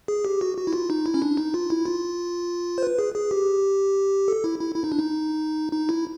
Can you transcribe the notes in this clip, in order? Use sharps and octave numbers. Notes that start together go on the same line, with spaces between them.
G#4
G4
F#4
F#4
E4
F4
D#4
E4
C#4
D4
D#4
F4
E4
F4
C5
B4
G#4
G#4
G4
A4
E4
E4
E4
D#4
D4
D#4
D#4
E4